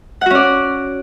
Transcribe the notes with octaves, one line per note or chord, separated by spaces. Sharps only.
C#4 F#4 D5 F#5